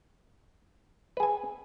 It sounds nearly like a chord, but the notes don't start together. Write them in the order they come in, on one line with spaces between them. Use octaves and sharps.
B4 G#4 G#5